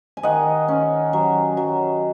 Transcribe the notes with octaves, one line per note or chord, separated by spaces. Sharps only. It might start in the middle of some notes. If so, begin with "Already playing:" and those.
G#5
D#3 D#5 F#5
C#4
F#3
F#3